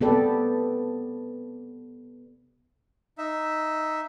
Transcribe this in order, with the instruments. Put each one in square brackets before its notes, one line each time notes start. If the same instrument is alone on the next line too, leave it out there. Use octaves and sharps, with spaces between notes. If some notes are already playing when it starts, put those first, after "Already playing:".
[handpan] C3 B3 G4 A4 B4 D5
[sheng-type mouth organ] D#4 E5